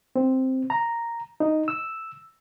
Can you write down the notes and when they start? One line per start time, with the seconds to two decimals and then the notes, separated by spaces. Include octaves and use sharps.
0.16 C4
0.70 A#5
1.40 D#4
1.68 E6